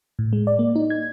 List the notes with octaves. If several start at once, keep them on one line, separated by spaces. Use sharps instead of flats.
A2
G#3
D5
A#3
D#4
G#6